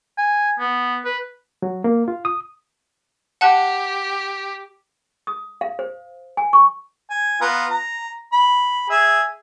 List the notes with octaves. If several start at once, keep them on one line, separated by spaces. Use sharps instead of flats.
G#5
B3
B4
F#3
A#3
F4
D#6
G4 F#5 A5 F#6
D#6
F5
C5
G#5
C#6
G#5
B3 F4 A#5
A#5
B5
G#4 E5